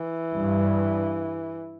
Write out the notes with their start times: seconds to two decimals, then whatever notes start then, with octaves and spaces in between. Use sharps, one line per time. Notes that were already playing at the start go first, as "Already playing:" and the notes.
Already playing: E3
0.35 G2